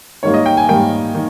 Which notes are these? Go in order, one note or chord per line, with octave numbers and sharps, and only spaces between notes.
G#2 D#3 G3 A#3 C#5
D#5
G5
G#5
G#2 D#3 G3 A#3 G5
D#3